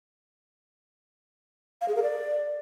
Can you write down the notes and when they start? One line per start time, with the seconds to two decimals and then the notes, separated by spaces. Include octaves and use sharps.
1.81 F5
1.88 G#4
1.96 A#4
2.03 D5